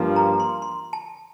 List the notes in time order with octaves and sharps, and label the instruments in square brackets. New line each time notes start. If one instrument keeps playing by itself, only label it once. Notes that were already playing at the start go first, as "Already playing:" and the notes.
Already playing: [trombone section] G2 F3 A#3
[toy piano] A#5
C6
C6
A5